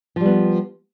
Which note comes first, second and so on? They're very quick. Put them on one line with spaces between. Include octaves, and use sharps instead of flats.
F3 G3 B3